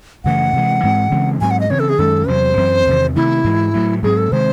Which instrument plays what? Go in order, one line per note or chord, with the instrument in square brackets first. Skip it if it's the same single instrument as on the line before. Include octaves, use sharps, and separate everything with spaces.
[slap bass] F#2 C#3 E3 A3 [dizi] F#5
[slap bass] C3 E3 G#3
G#2 E3 G#3 C4
C#3 E3 G#3 C4
[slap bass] G#2 F#3 C4 [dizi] G#5
[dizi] F#5
D#5
[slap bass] C#3 E3 C4 [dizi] C#5
[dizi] A4
G#4
[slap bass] F#2 D#3 G#3 C#4 [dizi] A4
[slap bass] E2 C3 F#3 [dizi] C5
[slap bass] F#2 E3 C4
E2 C3 D#3
[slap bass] C3 D#3 A3 [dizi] E4
[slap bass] G#2 E3 G#3
A2 F#3 A3
[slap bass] G#2 F#3 C4 [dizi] G#4
[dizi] A4
[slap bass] C3 D#3 G#3 C4 [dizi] C5